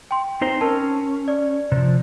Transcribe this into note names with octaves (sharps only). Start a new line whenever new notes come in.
G5 C6
C4 D#4 C5
C#4 A#4 A5
D5
C3 F3